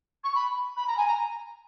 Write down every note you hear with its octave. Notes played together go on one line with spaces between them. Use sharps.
C#6
B5
B5
A#5
G#5
A#5